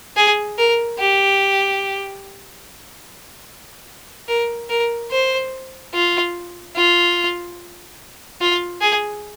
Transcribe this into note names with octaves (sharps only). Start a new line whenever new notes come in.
G#4
A#4
G4
A#4
A#4
C5
F4
F4
F4
G#4